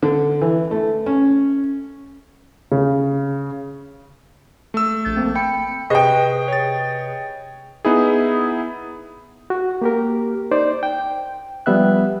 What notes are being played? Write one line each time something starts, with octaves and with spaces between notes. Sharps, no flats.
D3
E3
A3
C#4
C#3
A3 E6
A#1 G6 A6
F3 A#3 C4
G5 B5 C#7
C3 G#4 B4 C5 D#5 G5 C#6
C#5 A6
B3 D#4 E4 G#4
F#4
A#3 G4 A#4
D#4 C5 D5
G5
F3 G3 B3 E5 F#6